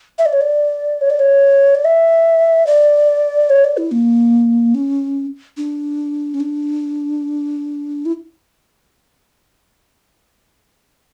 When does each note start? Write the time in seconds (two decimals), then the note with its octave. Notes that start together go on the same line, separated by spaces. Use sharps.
0.19 E5
0.26 D5
0.33 C#5
0.41 D5
1.01 C#5
1.10 D5
1.19 C#5
1.75 D5
1.85 E5
2.67 D5
3.50 C#5
3.64 D5
3.77 E4
3.92 A#3
4.75 C#4
5.57 D4
6.34 C#4
6.40 D4
8.06 E4